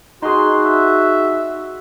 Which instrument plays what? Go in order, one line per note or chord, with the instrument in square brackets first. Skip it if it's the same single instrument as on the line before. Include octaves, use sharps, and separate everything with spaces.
[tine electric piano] D#4 G#4 [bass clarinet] F#4 [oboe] C6
[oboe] E5